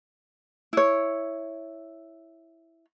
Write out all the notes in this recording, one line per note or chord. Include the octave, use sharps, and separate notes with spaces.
E4 C#5